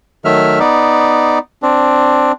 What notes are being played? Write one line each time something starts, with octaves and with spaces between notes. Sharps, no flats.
D#3 F#3 A3 E5 F6
B3 D#4 D5
C4 D4